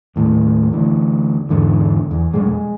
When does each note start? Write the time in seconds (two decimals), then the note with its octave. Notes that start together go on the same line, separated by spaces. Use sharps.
0.16 D#2 A2
0.72 D2 E3
1.49 E2 G#2 D3
2.11 E2
2.34 F2 B2 G3 G#3
2.48 G#3